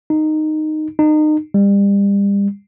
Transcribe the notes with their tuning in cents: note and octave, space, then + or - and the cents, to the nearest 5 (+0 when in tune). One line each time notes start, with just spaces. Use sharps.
D#4 -10
D#4 -30
G3 +35